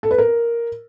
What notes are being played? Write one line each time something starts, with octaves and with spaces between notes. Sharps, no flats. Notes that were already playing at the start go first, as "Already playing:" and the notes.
A4
B4
A#4